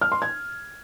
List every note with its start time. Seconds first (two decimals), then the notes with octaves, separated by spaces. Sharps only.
0.01 F6
0.12 C6
0.22 G#6